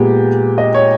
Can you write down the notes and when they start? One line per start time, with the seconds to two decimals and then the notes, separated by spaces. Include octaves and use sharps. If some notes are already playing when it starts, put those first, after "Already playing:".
Already playing: A#2 G#3 B3 G4
0.58 D#5
0.74 C#5